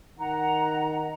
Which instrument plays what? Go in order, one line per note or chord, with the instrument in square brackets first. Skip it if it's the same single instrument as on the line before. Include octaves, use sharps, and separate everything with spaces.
[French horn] D#3 [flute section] F#5 A#5